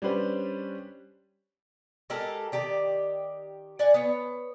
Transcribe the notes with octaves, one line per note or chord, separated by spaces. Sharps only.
G3 C#4 D4 G4 B4 C5
G#3 G4 A4 A#4
D#3 G4 D5
D5 F#5 G#5
B3 C#5